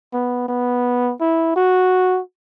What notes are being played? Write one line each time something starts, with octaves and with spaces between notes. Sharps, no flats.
B3
B3
E4
F#4